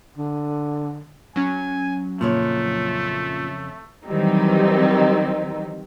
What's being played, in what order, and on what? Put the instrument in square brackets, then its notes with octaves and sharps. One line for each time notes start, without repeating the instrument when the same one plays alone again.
[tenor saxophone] D3
[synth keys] F#3 C#4 [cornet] G#5
[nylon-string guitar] F2 C#3 C#5 [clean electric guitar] A#2 [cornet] A3
[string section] D#3 E3 F#3 G3 C4 D#4